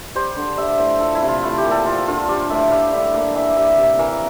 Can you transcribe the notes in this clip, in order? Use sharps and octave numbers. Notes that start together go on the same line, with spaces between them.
G3 C5
D3
G3 E5
A2 C5
F3 A4
E4
C3
F4
A3 E4
G4
A#2
A4
F3 F4
D3 F4
G3 D5
A2 E5
G3 F5
D3 E5
A#3 F5
E3 E5
G3 E5
C3
E3 A#4